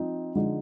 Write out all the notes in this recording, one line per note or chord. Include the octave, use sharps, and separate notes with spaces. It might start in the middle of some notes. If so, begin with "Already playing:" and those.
Already playing: F3 C4 D#4
D3 F3 G#3 D#4